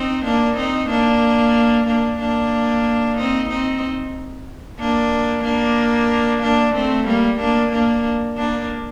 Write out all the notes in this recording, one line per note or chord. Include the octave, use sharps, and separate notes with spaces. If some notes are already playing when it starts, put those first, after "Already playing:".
Already playing: C4 D#4
A#3 D4
C4 D#4
A#3 D4
A#3 D4
A#3 D4
C4 D#4
C4 D#4
A#3 D4
A#3 D4
A#3 D4
A3 C4
G3 A#3
A#3 D4
A#3 D4
A#3 D4